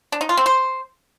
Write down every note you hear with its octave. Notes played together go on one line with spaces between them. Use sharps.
D4
D#4
F4
C4
C5